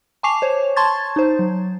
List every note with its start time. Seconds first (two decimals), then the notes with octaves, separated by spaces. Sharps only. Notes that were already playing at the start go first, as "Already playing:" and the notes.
0.23 G#5 A5 C#6 D6 C7 F7
0.42 C5 C#5
0.76 A5 C6 C#6 G#6 A6
1.16 D#4 C5
1.39 F#3